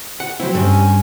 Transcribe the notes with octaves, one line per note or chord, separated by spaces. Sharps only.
F#5
F#3 C4 E4 C5
G2 G3 C#4
G#5